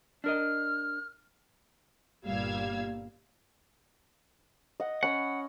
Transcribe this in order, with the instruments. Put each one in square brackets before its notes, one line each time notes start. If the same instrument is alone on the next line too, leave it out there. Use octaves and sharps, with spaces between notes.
[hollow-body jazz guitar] D4 A#4 D#5 [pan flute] F6
[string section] G1 A#2 G3 F5 E6 G#6
[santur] D#5 F#5
[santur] C#4 B5 [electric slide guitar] F#5